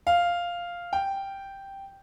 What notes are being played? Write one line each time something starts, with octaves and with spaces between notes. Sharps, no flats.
F5
G5